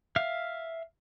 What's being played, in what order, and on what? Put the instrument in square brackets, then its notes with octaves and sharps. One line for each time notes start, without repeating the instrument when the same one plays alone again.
[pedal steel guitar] E5 F5 F6